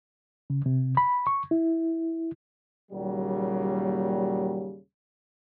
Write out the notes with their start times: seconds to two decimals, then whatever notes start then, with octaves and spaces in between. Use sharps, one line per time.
0.50 C#3
0.66 C3
0.97 B5
1.27 C#6
1.51 E4
2.91 D#2 A#2 C#3 F#3 G3